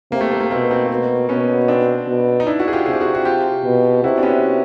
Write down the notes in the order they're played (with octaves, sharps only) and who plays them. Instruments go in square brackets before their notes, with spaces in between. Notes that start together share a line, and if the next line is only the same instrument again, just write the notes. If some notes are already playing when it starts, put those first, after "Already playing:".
[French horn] C3 [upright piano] A#3
[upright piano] A3
A#3
A3
[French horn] B2 [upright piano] A#3 C4
[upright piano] A#3 C4
[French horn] B2
[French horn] B2 [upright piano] B3 C#4
[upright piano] C4 D4
[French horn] B2
[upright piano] D#4
D4 E4
E4 F#4
G#4
F4 G4
[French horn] C3 [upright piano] G#4
[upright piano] G4
F#4 G#4
F#4
F4 G4
[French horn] B2
[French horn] C3 [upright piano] E4 F#4
[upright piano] D4
B3 C#4